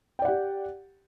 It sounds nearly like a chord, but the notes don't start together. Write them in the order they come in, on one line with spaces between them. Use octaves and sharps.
G5 D5 F#5 G4